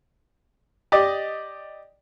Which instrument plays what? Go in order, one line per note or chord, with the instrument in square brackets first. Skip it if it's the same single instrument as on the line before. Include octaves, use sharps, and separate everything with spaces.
[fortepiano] G4 D5 D#5